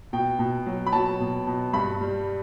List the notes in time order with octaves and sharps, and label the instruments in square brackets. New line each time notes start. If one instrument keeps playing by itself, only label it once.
[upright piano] B2 G5
B2
F#3
B5
F#3 A5
B2
B2
G2 B5
G3